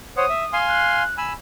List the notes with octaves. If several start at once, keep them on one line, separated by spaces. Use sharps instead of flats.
C5 C#5 F#5 D#6
E5
F5 G#5 C6
F#6
G#5 B5 E6